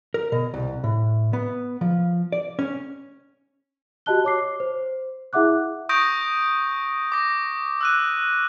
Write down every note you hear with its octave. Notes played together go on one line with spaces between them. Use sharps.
A#4
B2
C2
A2
B3
F3
D5
C#4
F#4 G4 D#5 A5 F#6 G7
C#5 D6 C7
C5
E4 G#4 E5 F#5 D6 F#6
C#6 D#6 G6 A#6 D7
D6 A#6
E6 F#6 D#7